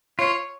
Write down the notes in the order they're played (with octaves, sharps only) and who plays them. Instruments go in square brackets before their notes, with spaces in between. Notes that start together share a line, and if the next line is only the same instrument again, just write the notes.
[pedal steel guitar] F4 [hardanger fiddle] C#5